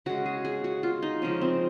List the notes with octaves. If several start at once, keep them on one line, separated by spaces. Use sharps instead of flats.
C#3 G#3 F#4
G#4
G#4
F#4
F4
D#4
C#3 F3 G#3 C#4
C4